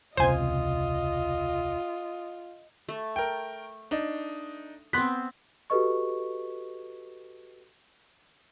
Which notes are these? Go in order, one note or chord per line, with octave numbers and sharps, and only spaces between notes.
E1 C#2 C3 F4 C5 D#5 G#5
A3
A#4 G5
D4 D#4
B3 C4 C6 F#6 B6
F#4 G4 A4 B4 D#5 C#6